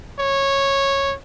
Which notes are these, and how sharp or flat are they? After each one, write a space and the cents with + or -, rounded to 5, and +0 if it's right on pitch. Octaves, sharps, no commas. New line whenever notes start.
C#5 -10